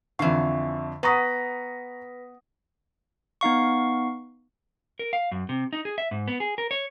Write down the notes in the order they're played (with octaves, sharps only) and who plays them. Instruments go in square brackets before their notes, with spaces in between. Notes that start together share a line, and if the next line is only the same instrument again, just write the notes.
[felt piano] F2 D3 [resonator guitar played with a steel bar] E3 F5 [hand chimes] E5 C#6
[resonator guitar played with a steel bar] B3 [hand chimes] B4 A#6 B6 [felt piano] A#5 C#6 D#6
[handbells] B3 D#4 F5 C#6
[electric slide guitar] A#4
F5
F#2
C3
D#4
G#4
E5
G#2
B3
G#4
A#4
C#5